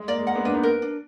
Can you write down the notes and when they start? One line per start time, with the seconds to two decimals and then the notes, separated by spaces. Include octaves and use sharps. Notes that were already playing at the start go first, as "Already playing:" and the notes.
Already playing: G#3
0.08 A#3 D5
0.18 G#3
0.27 A#3 F#5
0.35 G#3 B3
0.45 A#3 D4 B4
0.54 B3 D#4
0.63 A#4
0.82 D4